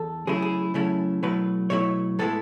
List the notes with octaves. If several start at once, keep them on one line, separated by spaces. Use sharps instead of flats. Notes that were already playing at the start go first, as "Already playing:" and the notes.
Already playing: E2 A4
C#3 F#3 A3 C#4 E4 G#4
G#4
C#3 F#3 A3 C#4 E4
B2 F#3 A3 E4 B4
B2 F#3 A3 E4 C#5
A2 G#3 B3 E4 A4